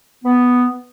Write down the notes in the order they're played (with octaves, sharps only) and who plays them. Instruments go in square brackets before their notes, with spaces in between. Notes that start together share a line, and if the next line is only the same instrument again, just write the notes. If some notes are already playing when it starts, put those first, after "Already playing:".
[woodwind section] B3